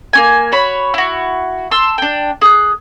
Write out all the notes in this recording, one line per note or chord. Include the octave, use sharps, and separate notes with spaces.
A#3 C#4 G#5
F#4 C#5 B5
E4 F#4
A5 C6 E6
D4 G5
G#4 F#6